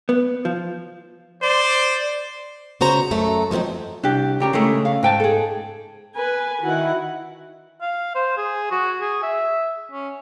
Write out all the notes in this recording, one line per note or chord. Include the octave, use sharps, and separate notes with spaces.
B3
F3
C5 D5
C#3 F#4 C5 A#5
F#2 A3 A#5
F3 F#3 A#3 C4 D#4
C2 D4 G4
C#3 G4 A#4
C#3 G#3 A3 E4 A#4
F5
G#2 G5 A5
G#4 A4
B4 G#5
D#3 E4 F#4 F#5
F5
C5
G#4
F#4
G#4
E5
C#4